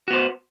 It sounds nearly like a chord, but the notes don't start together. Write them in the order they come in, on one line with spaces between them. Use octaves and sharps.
F#4 B3 C5